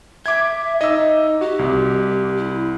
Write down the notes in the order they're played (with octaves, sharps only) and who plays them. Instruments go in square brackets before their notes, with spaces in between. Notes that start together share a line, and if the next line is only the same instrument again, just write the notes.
[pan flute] E5 [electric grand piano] D6 G#6
[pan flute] D#4 [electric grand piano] D#5 E6
[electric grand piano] F#4 [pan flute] G4
[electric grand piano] C2
[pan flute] E4